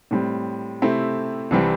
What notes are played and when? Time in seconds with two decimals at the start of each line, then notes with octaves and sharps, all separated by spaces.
0.11 A2 G3 C4
0.82 C3 A3 C4 E4
1.51 C2 C3 E3 G3 C4